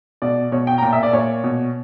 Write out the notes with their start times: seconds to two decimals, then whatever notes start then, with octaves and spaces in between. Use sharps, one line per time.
0.22 B2 D5
0.52 B2 C#5
0.67 G5
0.78 A#5
0.82 A#2 G5
0.93 E5
1.03 D5
1.13 A#2 C#5
1.44 B2